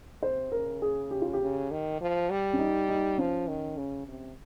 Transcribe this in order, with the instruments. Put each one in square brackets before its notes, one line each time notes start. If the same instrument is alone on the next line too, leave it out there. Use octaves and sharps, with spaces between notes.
[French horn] C3 [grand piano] C5
[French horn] C#3 [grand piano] A#4
[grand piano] G#4
G4
F4
G4
[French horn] C#3
D#3
F3
G3
[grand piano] C#4
D#4
D#4
[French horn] F3 [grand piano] C#4
[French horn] D#3
C#3
C3